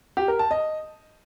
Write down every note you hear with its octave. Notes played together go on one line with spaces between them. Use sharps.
G4
A#4
A5
D#5